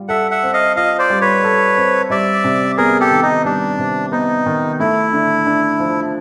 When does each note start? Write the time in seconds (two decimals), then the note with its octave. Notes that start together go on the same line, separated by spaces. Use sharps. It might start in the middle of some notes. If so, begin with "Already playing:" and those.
Already playing: G3 F4
0.08 A4 E5 F#5
0.31 E5 F#5
0.43 C4
0.53 D#5 F5
0.76 F4 D#5 F5
0.99 C5 D5
1.10 G3
1.21 B4 C#5
1.43 A4
1.77 C4
2.10 G3 D5 E5
2.44 C3
2.77 B3 G#4 A#4
3.00 G4 A4
3.11 D#3
3.22 D#4
3.45 G3 D4
3.78 C3
4.12 B3 D#4
4.46 D#3
4.79 A3 E4
5.13 D3
5.46 D4
5.80 F3